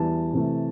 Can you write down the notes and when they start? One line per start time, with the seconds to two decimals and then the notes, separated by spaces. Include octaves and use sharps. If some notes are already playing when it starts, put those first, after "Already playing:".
Already playing: E2 E3 G3 A5
0.33 C3 E3 A3